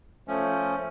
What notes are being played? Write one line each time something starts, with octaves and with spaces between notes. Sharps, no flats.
F3 A3 C#4